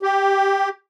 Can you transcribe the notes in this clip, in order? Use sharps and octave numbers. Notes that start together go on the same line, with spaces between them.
G4